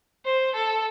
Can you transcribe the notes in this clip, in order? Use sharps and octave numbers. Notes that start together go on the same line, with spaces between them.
C5
A4